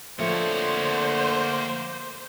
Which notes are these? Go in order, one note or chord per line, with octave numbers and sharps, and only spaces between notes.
D3 F3 A3 A#3 C5 C#5